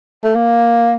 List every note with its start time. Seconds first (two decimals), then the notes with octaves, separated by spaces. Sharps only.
0.24 A3
0.35 A#3